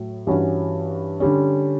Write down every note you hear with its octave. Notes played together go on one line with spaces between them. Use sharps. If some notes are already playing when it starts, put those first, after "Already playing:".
Already playing: A2 F#3
G2 E3 G3 C#4 F#4
D3 G3 C#4